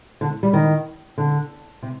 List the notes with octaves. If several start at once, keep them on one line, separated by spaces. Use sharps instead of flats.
D3
G3
D#3
D3
C3